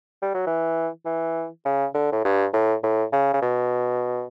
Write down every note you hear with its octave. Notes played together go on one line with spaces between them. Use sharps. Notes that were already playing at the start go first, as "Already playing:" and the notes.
G3
F#3
E3
E3
C#3
D3
A2
G2
A2
A2
C#3
C#3
B2